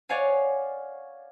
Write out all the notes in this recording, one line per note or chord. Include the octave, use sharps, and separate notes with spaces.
C#5 D5 F5 F#5 G#5